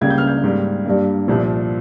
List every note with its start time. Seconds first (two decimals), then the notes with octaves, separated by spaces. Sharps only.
0.01 C#2 C#3 G3 A#3 G#6
0.10 G6
0.18 F6
0.27 G6
0.44 G#2 G3 A#3
0.86 G2 G3 A#3
1.28 C2 A#2 F3